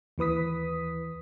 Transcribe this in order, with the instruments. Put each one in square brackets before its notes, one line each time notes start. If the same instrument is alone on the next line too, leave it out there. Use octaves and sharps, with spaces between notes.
[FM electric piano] D#2 E3 B4 D#6 B6